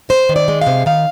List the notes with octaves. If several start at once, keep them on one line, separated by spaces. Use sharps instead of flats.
C3 C5
D#3
D5
G#3
F5
C3
D#3 F5